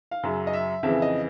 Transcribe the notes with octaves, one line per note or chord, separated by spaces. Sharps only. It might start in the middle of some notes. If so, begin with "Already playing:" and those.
F5
F#2 C#3 F#3 E5
D#5
E5
F2 C#3 E3 E5
D#5